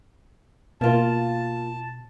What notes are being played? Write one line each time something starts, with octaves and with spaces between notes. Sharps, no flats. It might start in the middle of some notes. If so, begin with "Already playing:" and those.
B2 A#3 F4 A5